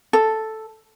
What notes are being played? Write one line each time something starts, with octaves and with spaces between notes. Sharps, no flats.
A4